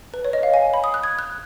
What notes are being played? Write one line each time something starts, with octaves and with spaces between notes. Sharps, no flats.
B4
C#5
D#5
F5
G#5
B5
D#6
F#6
G#6
F#6